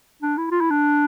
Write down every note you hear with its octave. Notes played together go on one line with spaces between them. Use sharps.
D4
E4
F4
E4
D4